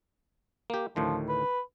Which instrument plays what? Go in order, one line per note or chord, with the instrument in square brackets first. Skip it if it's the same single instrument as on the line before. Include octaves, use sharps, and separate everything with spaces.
[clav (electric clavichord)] A#3 G4
[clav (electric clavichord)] D2 A2 D#3 [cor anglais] F3
[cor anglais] B4